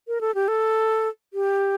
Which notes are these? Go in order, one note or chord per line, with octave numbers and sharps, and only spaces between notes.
A#4
A4
G4
A4
G4